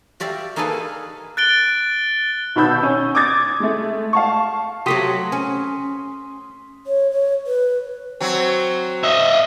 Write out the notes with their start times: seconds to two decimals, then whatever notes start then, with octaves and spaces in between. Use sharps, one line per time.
0.20 F#4 G4 D5 E5 F5
0.56 A#3 D#4 G#4 A4 B4 F5
1.37 F#6 A6 D7 G7
2.56 B1 B2 D#3 B5 E6 G6
2.83 C#4
3.15 D6 D#6 G#6 A6
3.60 G#3 A3
4.13 F5 A5 C#6
4.86 F#3 A3 G4 C6 D#6 B6
5.32 C#4
6.87 C#5
7.11 C#5
7.47 B4
8.20 F#3 C4
9.03 D#5 E5